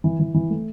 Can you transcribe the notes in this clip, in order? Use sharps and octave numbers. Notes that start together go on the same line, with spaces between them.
E3
E3
E3
A3